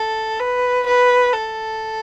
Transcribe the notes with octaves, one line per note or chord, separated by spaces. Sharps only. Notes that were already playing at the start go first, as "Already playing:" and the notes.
Already playing: A4
B4
B4
A4